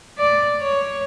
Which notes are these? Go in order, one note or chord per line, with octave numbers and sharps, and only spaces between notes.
D5
C#5